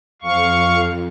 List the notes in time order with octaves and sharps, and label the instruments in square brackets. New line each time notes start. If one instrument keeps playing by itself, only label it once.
[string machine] F2 [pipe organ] F5 C#6